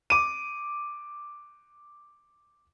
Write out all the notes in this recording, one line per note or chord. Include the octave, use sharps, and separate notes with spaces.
D6 D#7